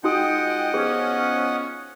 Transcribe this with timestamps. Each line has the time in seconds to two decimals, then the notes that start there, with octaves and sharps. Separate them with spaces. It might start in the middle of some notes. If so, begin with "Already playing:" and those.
0.04 G#3 D#4 F4 F#4 D#5 F#5 G5 D#6
0.74 F3 B3 C#4 G#4